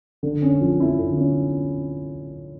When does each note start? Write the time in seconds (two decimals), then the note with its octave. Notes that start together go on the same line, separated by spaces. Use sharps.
0.23 D3
0.42 C#4
0.61 F3
0.80 E4
0.99 D3
1.17 C#4